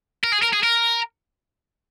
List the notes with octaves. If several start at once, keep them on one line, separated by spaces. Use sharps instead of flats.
A#4
G#4
A#4
G#4
A#4